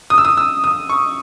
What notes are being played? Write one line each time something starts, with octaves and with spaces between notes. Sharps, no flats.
D#6
E6
D#6
E6
D#6
C#6